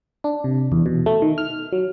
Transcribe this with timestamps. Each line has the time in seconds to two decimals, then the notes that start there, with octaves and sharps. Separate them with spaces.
0.24 D4
0.44 C3
0.72 E2
0.86 B2
1.06 A3
1.22 D#3
1.38 F6
1.72 F#3